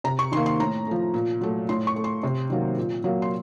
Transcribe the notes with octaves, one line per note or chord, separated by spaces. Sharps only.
C3 A#5
C#6
D#3 C6
A#3
C6
A2 A#5
F3 A3
A#2
F#3 A3
A2 C6
C#6
A3
C6
C3
D#3 F#3 A#3
A#2
F#3 A#3
C6